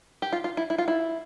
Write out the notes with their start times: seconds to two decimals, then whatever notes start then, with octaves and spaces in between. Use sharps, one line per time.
0.22 G4
0.32 F4
0.44 F4
0.57 E4
0.70 E4
0.78 F4
0.88 E4